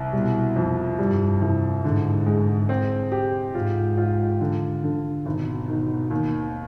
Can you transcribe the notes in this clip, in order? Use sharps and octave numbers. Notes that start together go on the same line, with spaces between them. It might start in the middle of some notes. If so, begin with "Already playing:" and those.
Already playing: C2
B2 G3
F2
G2 G3
C2
G#2 D3
G#3
C4
G4
G#2 F4
F4
D3
D3
G#1 B2
D#3
D#2